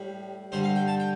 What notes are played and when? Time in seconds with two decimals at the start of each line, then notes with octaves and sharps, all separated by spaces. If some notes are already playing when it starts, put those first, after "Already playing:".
Already playing: A2 G3
0.52 G2 D3 G3 C5
0.64 F5
0.76 G5
0.88 A5
1.00 G5